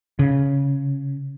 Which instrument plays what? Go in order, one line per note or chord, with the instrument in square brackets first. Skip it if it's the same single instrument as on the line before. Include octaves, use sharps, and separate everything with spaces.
[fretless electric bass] C#3